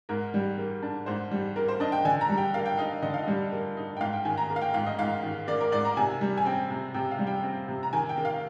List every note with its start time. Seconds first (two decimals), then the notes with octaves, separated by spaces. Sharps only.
0.09 G#2 A#4
0.34 G3
0.58 A#3
0.82 D4
1.06 G#2 C5
1.31 G3
1.56 A#3 A#4
1.68 C5
1.80 D4 D#5
1.92 G5
2.05 D3 G#5
2.21 A#5
2.30 G3
2.38 G5
2.54 A#3 F5
2.66 G5
2.77 D#4 F5
3.02 D3 D#5
3.14 F5
3.24 G3 D#5
3.52 A#3
3.77 D#4
3.97 G5
4.01 G#2 F5
4.13 G5
4.25 D#3 G#5
4.38 A#5
4.50 A#3
4.56 F5
4.62 G5
4.74 G#2 F5
4.86 D#5
4.99 G#2 F5
5.23 D#3
5.48 A#3 D5
5.61 A#4
5.72 G#2 D5
5.85 A#5
5.97 C3 G#5
6.21 G3
6.38 G#5
6.45 C4 G5
6.71 C3
6.94 C3 G5
7.11 F5
7.19 G3
7.27 G5
7.43 C4
7.68 C3
7.83 A#5
7.93 D#3 G#5
8.09 G5
8.17 A#3
8.25 F5